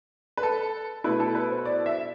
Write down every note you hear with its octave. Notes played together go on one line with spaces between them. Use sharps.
B4
A4
B2 A3 E4 B4
A4
B4
C5
D5
E5